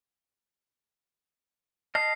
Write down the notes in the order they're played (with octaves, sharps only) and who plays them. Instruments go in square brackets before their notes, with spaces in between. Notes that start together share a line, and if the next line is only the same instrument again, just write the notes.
[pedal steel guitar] D#5 A5 F6 [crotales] C7